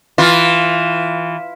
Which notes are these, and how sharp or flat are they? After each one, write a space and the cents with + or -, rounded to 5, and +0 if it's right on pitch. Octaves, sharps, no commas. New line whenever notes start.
E3 -5 F4 +0